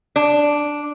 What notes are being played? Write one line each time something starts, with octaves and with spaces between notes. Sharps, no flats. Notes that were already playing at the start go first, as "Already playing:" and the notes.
D4